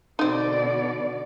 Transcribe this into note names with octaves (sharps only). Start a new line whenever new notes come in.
B2 D3 C4 D#4 D5